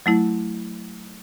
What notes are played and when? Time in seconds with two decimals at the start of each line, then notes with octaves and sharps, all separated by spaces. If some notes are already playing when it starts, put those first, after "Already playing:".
0.06 F#3 A3 E4